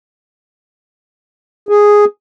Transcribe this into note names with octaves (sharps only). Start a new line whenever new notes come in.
G#4